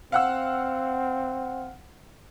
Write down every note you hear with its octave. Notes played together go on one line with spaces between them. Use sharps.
C4 F5 F#5 E6